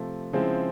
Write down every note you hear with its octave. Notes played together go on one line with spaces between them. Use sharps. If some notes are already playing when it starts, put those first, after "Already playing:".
Already playing: C3 F3 A3
C#3 F3 G#3 C4 E4